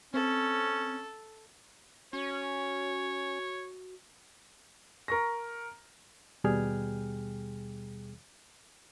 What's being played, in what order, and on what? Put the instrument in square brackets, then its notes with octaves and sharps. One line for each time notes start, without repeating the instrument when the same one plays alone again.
[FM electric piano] C4 [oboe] C#4 [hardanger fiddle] A4
[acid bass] C#4 [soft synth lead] F#4 [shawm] C#5
[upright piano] A#4 C#6 A#6
[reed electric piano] D#2 B2 G3 G#4 G5 F6